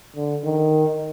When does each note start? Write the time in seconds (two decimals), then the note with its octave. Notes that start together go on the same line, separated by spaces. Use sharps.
0.16 D3
0.45 D#3